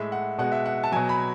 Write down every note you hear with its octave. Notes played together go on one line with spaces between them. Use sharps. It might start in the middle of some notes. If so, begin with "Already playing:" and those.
Already playing: A2 G#3 E5
F#5
B2 G#3 F#5
E5
F#5
A5
B2 F#3 G#5
B5